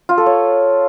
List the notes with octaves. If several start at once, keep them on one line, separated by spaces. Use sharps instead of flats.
F4
A4
C#5